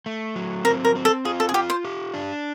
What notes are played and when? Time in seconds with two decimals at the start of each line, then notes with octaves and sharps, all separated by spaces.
0.06 A3
0.36 F#3
0.65 C4 A#4
0.85 A#4
0.96 C4
1.05 A4
1.25 F4 G#4
1.40 A4
1.49 G#4
1.54 F4 G4
1.70 C5
1.85 G4
2.14 D4